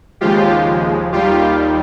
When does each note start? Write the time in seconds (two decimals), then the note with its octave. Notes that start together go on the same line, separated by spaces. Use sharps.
0.21 D#2 C#3 F3 G#3 F4 G4
1.13 D#2 D#3 G3 F4 G4